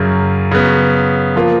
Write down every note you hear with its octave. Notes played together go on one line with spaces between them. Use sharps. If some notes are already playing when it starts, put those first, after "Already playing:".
Already playing: F#2 C#3 F#3
C#3 F#3 B3
F3 A#3 F4